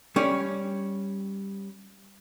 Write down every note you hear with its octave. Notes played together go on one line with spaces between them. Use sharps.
G3 C#4 C#5 D5